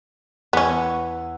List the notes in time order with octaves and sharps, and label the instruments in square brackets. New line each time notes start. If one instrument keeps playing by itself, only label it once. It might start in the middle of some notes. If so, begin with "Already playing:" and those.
[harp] E2 F#5 B5 [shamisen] B3 C#4